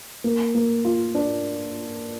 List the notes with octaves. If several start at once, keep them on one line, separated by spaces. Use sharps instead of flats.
A#3
A#3
F4
D4